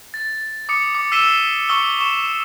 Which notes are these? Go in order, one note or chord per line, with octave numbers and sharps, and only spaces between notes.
A6
D6 D#6 C#7
D6
E6 B6 C7 D#7 E7 G7
C#6 D#6 E6 C#7 G7
C#6 E7